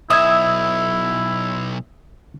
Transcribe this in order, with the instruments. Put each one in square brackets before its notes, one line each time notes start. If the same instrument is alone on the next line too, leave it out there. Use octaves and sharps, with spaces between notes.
[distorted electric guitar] B1 [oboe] E4 [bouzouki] E5 [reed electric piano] D#6 E6 G#6